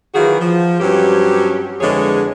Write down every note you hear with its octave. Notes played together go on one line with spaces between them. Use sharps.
D#3 E3 F#3 F4 F#4 G#4
F3
G2 F#3 C4 C#4 G4
F2 D3 E3 G#3 G#4 C#5